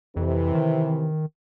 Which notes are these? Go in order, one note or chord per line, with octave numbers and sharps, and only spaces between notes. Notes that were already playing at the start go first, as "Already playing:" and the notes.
F2 C3 E3
D#3